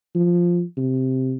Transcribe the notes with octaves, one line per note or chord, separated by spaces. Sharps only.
F3
C3